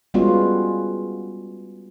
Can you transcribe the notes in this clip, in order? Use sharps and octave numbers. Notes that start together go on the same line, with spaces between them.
G3 G#3 B3 C#4 F4 F#4